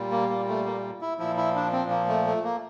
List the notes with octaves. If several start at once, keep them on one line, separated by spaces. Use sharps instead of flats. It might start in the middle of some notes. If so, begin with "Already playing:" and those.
Already playing: A#2 G3
A#3
A#3
A3
A#3
E4
A#2 F3 E4
E4
D4
C4
A#3
A3
A3
A#3